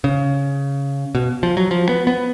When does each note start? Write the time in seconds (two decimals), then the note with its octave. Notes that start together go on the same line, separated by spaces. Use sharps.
0.04 C#3
1.15 B2
1.43 F3
1.57 F#3
1.71 F3
1.89 B3
2.07 B3